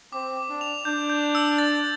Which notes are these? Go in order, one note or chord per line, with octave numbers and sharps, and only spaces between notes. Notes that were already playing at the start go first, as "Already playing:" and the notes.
C4 D6
D6
D4
F7
D4 G6
G6
E6
A6